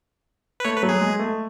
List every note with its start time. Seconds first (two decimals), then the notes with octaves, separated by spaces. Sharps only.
0.60 B4
0.65 A3 C#5
0.77 B4
0.83 F#3
0.89 G#4
1.01 G#3
1.19 A3